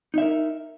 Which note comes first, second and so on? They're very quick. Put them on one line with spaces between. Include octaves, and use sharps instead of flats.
D#4 E5 A#4